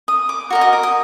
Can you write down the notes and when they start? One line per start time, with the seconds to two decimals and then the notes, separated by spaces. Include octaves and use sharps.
0.08 D#6
0.29 D6
0.50 F#4 A#4 D#5
0.61 D#6
0.73 D6
0.83 D#6